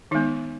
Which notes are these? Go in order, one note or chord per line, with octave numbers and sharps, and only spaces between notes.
D#3 G#3 B3 D#4